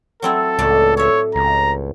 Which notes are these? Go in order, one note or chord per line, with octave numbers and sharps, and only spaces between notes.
F#3 C4 E4 A4
C#2 A2 D5
A4 C#5 E5
C#2 A#5